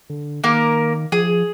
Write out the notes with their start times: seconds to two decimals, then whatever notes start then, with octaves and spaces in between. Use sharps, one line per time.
0.10 D3
0.44 D#3 A#3 A#4
1.12 F3 G#4